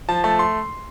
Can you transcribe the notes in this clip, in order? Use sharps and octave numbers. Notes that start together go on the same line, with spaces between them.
F3 A5
A3 A5
C6